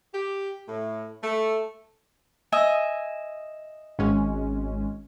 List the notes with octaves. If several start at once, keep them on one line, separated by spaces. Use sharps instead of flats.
G4
A2
A3
D#5 E5 G#5
G#1 G#3 C#4